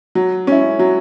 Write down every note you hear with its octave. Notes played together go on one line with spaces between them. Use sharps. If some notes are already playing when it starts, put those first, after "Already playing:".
F#3
C#4 E4
F#3